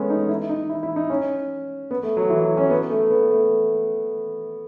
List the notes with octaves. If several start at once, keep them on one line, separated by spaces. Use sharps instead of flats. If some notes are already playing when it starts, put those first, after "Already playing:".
Already playing: G#3 A3 B3 C#4
D#4
E4
D#4
E4
E4
D#4
C#4
B3
A3
F#3
E3
F#3
C#4
B3
A3
B3
A3